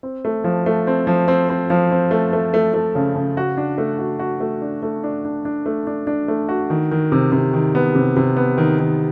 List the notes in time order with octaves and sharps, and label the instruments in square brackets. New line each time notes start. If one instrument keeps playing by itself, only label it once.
[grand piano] C4
A3
F3
A3
C4
F3
C4
C4
F3
C4
A3
A3
A3
A3
C#3
C#3
F#4
D4
A3
F#4
F#4
A3
D4
A3
D4
D4
D4
A3
D4
D4
A3
F#4
D#3
D#3
C3
C3
D#3
B3
C3
C3
B3
D#3
D#3